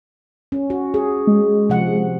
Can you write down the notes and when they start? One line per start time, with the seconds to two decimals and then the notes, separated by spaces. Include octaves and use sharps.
0.52 C#4
0.70 F#4
0.94 G#4
1.27 G#3
1.69 C3 F3 F#5